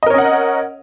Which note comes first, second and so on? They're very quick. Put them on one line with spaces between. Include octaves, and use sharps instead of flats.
D#5 A#4 C#5 C#4 F#5